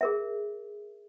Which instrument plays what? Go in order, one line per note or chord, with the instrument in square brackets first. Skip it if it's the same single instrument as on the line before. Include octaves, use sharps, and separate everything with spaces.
[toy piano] G#4 A#4 E5